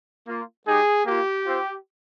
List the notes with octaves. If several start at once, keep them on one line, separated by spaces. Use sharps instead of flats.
A#3 F4
G#3 D#4 G4 G#4
A#3 F4 G4
C4 F4